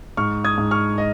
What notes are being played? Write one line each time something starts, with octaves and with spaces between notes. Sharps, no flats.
G#2 C#6 F6
D#6 G#6
G#2
C#6 F6
D#5